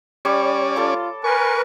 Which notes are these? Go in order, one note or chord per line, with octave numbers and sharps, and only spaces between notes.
G3 C#4 C#5 D5
F4 A4 D6
A#4 B4 G#5 C#6